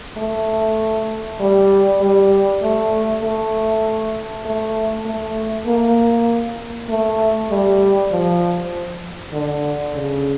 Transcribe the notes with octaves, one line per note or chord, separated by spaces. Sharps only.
A3
G3
G3
A3
A3
A3
A3
A#3
A3
G3
F3
D3
C#3